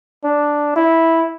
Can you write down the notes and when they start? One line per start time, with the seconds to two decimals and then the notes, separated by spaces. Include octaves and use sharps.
0.24 D4
0.76 E4